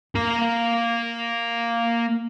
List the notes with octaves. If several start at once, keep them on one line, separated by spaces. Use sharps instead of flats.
A#3 A#5